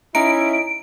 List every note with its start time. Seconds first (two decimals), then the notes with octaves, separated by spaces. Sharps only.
0.15 C#4 D#4 E4 D7